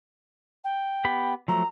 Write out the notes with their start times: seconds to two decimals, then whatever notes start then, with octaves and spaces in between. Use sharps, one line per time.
0.64 G5
1.05 B3 G4 B5
1.48 F3 F#3 A3 A#5